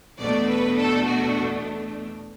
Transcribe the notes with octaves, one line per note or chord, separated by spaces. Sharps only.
E2 B2 A3 D4 D5
B4
A4
F#4